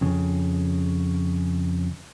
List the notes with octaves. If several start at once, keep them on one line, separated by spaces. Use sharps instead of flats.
F2 C#3